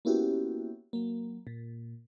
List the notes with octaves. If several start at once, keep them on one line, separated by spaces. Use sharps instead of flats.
A#3 B3 C#4 E4 F#4 G4
F#3 A#3
A#2